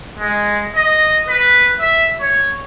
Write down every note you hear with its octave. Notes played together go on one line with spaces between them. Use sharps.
G#3
D#5
B4
E5
C#5